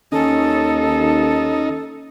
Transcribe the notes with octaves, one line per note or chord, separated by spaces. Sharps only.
D#2 D#3 C#4 D#4 A4 D#5